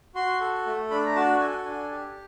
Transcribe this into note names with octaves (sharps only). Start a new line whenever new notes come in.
F#4 C6
A4
A3
D4 B5
A#5
F#4 A5
A4 G#5
D4 G#5
G4